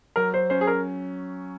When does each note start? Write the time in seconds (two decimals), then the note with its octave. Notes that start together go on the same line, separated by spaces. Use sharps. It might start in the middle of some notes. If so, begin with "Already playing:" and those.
0.16 F#3 A#4
0.34 C5
0.50 C#4 C5
0.61 G#4
0.67 A#4